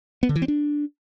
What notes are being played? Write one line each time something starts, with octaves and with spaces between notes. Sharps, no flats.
B3
D3
E3
C4
D4